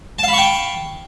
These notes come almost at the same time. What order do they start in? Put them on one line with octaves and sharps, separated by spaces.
A5 F5 B5 C#6 G5